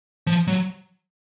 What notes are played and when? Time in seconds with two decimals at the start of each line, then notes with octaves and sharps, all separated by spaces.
0.27 F3
0.47 F#3